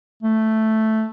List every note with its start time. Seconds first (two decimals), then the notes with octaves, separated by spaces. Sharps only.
0.23 A3